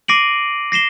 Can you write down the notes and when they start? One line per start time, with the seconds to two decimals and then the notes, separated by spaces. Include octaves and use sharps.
0.08 D6 A#6 C7 D7 D#7 F#7
0.72 A#6 C7 E7 G7